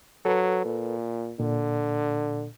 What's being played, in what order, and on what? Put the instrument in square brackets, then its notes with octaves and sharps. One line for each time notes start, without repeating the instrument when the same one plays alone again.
[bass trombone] F#3 [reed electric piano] A4 B4
[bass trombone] A#2
[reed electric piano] A#2 [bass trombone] D3